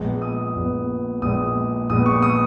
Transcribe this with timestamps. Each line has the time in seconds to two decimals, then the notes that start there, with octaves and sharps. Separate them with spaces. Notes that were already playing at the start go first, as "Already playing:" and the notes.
Already playing: A#1 A#2 G#3 B3
0.22 D#6
0.56 A#1 A#2 G#3 B3
1.22 A#1 A#2 G#3 B3 D#6
1.89 A#1 A#2 G#3 B3 D#6
2.06 C#6
2.22 D#6